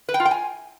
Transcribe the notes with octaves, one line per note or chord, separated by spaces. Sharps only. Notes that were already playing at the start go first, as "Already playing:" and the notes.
B4
G5
F4
G5
G#5